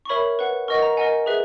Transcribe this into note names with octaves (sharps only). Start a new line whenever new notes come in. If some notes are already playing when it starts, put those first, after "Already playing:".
C#6
A#4 C#5 E5 B5
B4 F#5
A#4 D#5 F#5 C#6
A#5
A#4 D#5 F#5 G#5
G#4 B4 E5